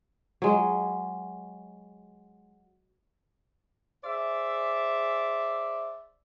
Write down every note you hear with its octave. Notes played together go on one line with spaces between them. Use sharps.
F#3 G#3
G#4 C5 D5 E5